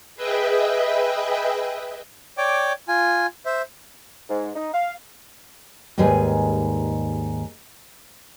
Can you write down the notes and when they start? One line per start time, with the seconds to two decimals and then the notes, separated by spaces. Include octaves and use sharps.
0.16 G#4 B4 D#5 E5 G5
2.38 C#5 D5 G5 D6
2.88 F4 G#5
3.46 C5 E5
4.30 G#2
4.55 D#4
4.74 F5
5.98 D#2 G#2 G3 G#4 B4 G#5